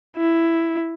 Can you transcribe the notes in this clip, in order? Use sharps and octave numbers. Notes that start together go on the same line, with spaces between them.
E4